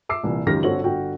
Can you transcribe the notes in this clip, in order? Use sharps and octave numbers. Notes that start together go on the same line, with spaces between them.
E5 D6 E6 C7
C2 A#2 E3
C#2 F#2 D#3 G4 F6 A#6
G1 C4 F#4 A4 C#5 F#7
G1 F#4 G5